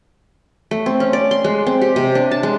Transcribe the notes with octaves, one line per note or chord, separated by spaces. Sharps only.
A3
C4
C#4
D5
C6
G#3
C4
G4
C3
D4
A5
G#3